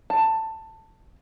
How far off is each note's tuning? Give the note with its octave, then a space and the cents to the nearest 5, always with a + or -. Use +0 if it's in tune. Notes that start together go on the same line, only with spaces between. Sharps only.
A5 +15